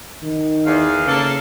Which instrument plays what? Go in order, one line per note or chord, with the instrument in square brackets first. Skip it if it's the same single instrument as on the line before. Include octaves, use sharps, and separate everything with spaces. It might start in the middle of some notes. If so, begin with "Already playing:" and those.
[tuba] D#3
[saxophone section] E2 [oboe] F5
[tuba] C#3 [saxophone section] A#3 A4